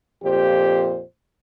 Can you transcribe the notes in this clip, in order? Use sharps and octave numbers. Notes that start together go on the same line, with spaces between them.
F2 A#2 F4 G4 C5